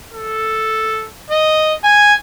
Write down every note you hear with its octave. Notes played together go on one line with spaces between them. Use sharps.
A4
D#5
G#5